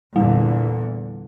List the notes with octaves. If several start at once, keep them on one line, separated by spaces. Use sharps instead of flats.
E2 A#2 D3 G3